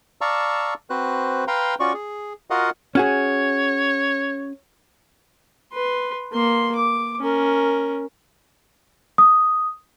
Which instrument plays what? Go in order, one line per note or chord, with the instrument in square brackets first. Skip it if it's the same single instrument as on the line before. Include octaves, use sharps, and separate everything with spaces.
[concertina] D5 F5 A5 A#5 C#6 E6
C4 F#4 B4 C5 F#6
B4 F5 G5 A#5 C6
C#4 F4 F#4 D5 C#6
G#4
F4 F#4 A#4 D#5 F5 F#5
[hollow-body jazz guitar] C#4 F#4 G#4 [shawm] C#5
[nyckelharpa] B4 C6
A#3 C6
D6
C#4 A#4
[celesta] D#6